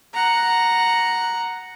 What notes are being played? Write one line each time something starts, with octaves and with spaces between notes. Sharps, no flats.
F#5 A#5